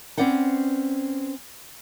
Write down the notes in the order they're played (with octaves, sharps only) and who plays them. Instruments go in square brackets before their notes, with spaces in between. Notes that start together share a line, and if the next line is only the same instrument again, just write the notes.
[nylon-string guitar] C4 C#4 B4 D5 F#5 G5